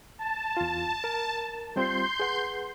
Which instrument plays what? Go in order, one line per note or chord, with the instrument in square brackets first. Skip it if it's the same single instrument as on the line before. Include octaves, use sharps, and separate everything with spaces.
[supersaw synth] A5
[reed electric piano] E2 F4
A#4
[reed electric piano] G3 C4 F4 [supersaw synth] C6 G6
[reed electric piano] G#4 B4 F#5